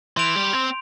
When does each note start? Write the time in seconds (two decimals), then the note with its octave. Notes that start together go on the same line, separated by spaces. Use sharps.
0.16 E3 C6 G6 D7 F7
0.36 G3
0.53 C4